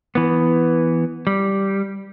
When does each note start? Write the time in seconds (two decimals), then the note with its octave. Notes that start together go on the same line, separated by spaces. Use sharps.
0.15 E3 B3
1.27 G3